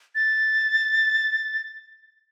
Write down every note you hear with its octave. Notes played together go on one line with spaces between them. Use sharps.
A6